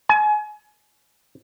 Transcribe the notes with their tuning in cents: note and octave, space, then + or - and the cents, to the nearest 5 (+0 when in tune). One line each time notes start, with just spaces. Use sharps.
G#5 +30